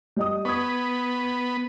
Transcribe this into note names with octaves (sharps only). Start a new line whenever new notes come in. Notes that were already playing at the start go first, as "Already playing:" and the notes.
G3 D#5 D#6
B3 C#6 D#6 G#6